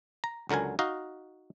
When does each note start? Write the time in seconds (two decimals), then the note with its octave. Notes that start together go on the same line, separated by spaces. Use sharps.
0.24 A#5
0.49 C#2 D3 F#3 A#4 G#5
0.79 D#4 F#4 D#5 F5